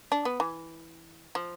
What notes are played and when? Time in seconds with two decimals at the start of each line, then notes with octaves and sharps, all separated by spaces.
0.12 D4
0.25 B3
0.40 E3
1.35 F3